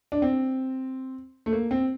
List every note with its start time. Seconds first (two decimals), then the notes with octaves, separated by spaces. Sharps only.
0.12 D4
0.22 C4
1.46 A3
1.53 A#3
1.71 C4